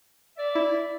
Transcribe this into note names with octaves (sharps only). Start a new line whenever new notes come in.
D5 E5
E4